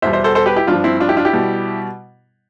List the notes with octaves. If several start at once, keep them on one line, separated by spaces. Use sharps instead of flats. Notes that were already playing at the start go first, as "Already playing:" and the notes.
E2 B2 G3 C5 E5
C5 E5
A4 C5
A4 C5
G4 B4
E4 G4
G2 F3 D4 F4
C4 E4
D4 F4
E4 G4
D4 F4
E4 G4
B2 G3